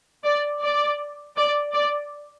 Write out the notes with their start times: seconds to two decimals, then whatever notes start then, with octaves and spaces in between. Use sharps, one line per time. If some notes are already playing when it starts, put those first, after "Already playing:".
0.24 D5
0.62 D5
1.36 D5
1.73 D5